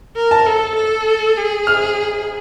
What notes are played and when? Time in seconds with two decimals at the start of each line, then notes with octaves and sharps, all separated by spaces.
0.17 A#4
0.31 A5
0.47 A4
0.76 A4
1.37 G#4
1.67 F6